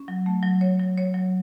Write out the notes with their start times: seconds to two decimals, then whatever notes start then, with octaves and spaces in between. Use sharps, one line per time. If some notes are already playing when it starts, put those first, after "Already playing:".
Already playing: C#4
0.08 F#3
0.26 A3
0.43 F#3
0.61 C#5
0.80 F#3
0.98 C#5
1.14 F#3